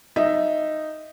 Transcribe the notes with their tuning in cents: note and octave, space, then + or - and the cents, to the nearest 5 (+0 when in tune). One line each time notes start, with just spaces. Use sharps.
D#4 -5 E5 +5